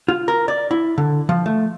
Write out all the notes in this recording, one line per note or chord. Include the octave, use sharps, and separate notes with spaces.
F4
A#4
D5
E4
D3
F3
A3